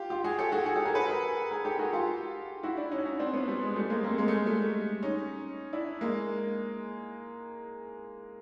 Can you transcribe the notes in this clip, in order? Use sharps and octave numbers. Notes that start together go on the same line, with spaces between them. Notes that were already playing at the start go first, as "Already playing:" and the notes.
Already playing: F4 G4
F4 G4
F#4 G#4
G4 A4
F#4 G#4
F#4 G#4
G4 A4
G#4 A#4
A4 B4
G#4 A#4
G#4 A#4
G4 A4
F#4 G#4
F4 G4
E4 F#4
D4 E4
C#4 D#4
C#4 D#4
C4 D4
B3 C#4
G3
G#3
G3 A3
G#3 A#3
A#3 C4
G#3 A#3
A3
G#3
G3 A3
C#4 D#4
D4 E4
G#3 A#3